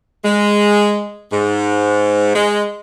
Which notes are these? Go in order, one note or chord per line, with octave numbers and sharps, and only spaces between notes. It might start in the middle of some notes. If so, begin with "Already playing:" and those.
G#3
G#2
G#3